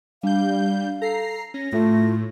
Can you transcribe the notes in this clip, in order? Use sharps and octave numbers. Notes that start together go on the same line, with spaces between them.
G3 D4 F5 G6
A4 A#5 C7
C#4 A#6
A2 A3 F4